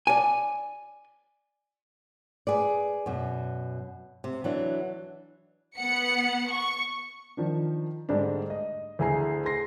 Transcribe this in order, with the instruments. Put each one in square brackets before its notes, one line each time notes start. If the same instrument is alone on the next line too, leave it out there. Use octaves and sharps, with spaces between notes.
[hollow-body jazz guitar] D5 G#5
[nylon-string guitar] G#4 B4 D5
F#2 B2
C3
E3 F#3 D4
[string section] B3 F#5 C#7
C#6
[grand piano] D#3 F3 D4
G#2 D3 G3 A3 D4
D#5
D2 E4 G#4 G#5 A#5 C7
G#4 C6 A#6 C7